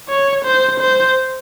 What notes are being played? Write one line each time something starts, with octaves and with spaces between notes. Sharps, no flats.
C#5
C5
C5